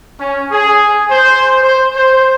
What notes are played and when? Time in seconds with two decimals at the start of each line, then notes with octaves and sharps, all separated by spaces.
0.20 C#4
0.51 G#4
1.10 C5
1.63 C5
1.96 C5